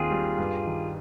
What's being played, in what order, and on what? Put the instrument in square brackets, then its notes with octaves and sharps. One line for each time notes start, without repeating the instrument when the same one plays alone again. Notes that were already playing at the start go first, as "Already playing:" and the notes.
Already playing: [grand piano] D#2 D#3 C4 [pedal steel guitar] F4 G#4
[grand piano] G3
G2
D#3